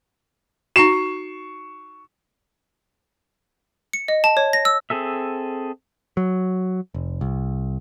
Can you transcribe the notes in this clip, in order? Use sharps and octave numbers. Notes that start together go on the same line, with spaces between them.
D#4 F#4 C#6 C7 E7
C#7
D#5
A5
C#5
A#6
E6
C4 G#4 A4 E5
F#3
F1
C2